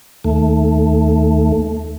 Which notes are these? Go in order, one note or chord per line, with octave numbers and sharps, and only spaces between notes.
D#2 A3